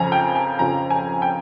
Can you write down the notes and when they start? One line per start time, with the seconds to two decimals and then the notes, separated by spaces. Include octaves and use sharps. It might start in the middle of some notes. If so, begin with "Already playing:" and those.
Already playing: F2 C#3 F3 G#5 A#5
0.12 G5
0.36 G#5
0.59 F2 C#3 F3 A#5
0.90 G#5
1.22 G5